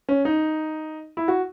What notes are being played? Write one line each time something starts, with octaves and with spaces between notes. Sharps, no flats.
C#4
D#4
E4
F#4